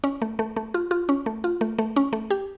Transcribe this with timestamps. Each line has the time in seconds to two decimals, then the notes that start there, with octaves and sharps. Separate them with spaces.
0.04 C#4
0.22 A3
0.39 A3
0.56 A3
0.74 F4
0.91 F4
1.09 C#4
1.26 A3
1.44 F4
1.61 A3
1.79 A3
1.96 C#4
2.13 A3
2.30 G4